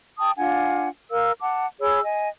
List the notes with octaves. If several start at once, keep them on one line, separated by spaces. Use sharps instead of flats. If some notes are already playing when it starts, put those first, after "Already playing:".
G5 A5 D#6
D4 F4 F#5 G#5
A#4 F5 E6
F#5 A5 D6
G#4 C#5 B5 E6
D#5 G#5